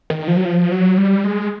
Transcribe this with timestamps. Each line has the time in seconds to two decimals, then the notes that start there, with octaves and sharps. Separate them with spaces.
0.10 D#3
0.28 F3
0.37 F#3
0.45 F3
0.72 F#3
0.98 G3
1.24 G#3